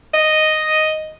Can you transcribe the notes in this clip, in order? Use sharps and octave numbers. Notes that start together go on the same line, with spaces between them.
D#5